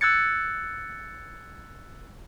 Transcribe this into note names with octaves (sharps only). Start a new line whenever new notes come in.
E6 F#6 G#6 A6 C#7